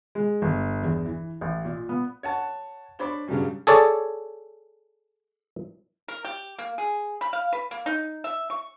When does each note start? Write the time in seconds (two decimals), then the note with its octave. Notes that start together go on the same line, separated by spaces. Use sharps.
0.15 G#3
0.42 G1
0.83 E2
1.05 E3
1.41 A1
1.65 A#2
1.89 B3
2.23 C#5 F#5 A5
2.99 D4 C5 C#5 B5 D6
3.28 G2 C#3 F#3 G3 C#4
3.67 G#4 A4 C#5 D5
6.08 A#4
6.25 G4
6.59 A#3
6.78 G#4
7.21 B5
7.33 F5
7.53 B4
7.71 A#3
7.86 D#4
8.24 E5
8.50 C#6